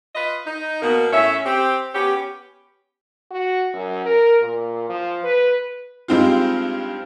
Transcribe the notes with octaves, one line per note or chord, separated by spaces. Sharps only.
F4 B4 D#5
D#4
B2 A#3 B3 F#4
A2 C#4 E5
C4 G4
B3 C#4 G4
F#4
F#2
A#4
A#2
F3
B4
G2 G#3 C4 D#4 F4